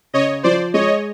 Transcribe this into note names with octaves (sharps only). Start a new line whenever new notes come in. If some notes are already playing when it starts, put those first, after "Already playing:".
C#3 C#5 D#5
F3 C5 D5
G#3 C#5 D#5